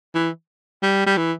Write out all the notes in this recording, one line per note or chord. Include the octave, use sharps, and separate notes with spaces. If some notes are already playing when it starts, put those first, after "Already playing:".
E3
G3
G3
E3